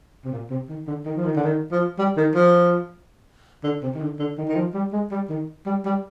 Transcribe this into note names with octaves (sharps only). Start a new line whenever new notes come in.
C3
A#2
C3
D#3
D3
D#3
F3
D#3
D3
D#3
F3
G3
D#3
F3
D3
C3
D#3
D3
D3
D#3
D#3
F3
G3
G#3
G3
D#3
G3
G3